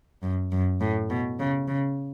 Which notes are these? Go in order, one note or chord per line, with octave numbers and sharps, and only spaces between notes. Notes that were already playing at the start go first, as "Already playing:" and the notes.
F#2
F#2
A2
B2
C#3
C#3